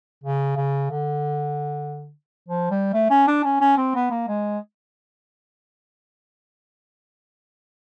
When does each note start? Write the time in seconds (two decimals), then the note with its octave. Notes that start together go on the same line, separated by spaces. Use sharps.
0.24 C#3
0.57 C#3
0.91 D3
2.49 F3
2.71 G3
2.93 A3
3.10 C#4
3.28 D4
3.44 C#4
3.61 C#4
3.77 C4
3.95 B3
4.11 A#3
4.28 G#3